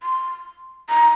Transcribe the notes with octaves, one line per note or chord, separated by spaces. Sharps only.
C6
A#5